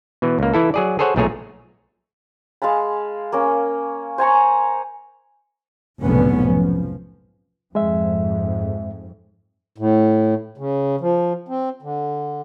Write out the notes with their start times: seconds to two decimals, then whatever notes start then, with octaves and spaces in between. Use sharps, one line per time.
0.22 B2 E3
0.39 C#2 A#3
0.54 E3 E4 A4
0.74 F#3 G#4 D5
0.99 G#4 A4 C5 C#5 F#5
1.16 B1 A#2 A3 G#4 C#5 A#5
2.62 G#3 F5 A5 B5
3.32 A#3 C#4
4.18 C5 G#5 A#5 C#6
6.03 F1 B1 G#2 D3 B3 C#4
6.43 F3
7.75 F2 G#2 G#3 E5
9.78 A2
10.58 C#3
11.01 F3
11.48 C4
11.82 D3